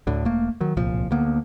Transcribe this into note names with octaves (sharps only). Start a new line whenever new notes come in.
D2 A2 D3
E1 A3 A#3
D#3 F#3
D1 C2 A#2 F3
D2 D3 A#3 B3